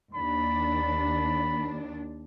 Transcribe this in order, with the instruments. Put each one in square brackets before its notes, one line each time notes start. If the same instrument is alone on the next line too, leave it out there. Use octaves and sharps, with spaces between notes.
[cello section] D#2 D4 [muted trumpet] B5